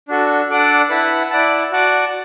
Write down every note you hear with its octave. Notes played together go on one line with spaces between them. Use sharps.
D4 F#4 A4
D4 A4 D5 F#5
E4 B4 F#5 A5
E4 D5 F#5 A5
F#4 D5 F#5 A5